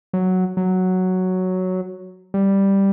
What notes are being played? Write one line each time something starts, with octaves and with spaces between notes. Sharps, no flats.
F#3
F#3
G3